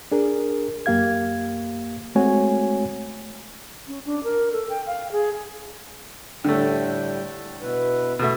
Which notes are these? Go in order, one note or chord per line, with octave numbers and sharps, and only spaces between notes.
D4 G#4 A#4
F#2 A#3 G4 F5 G#6
G#3 A3 C4 F#4 C#5 G#5
C#4
D4
A#4
A4
G5
F5
G#4
A2 D3 G3 A3 G5
B2 E4 B4
B2 A3 E5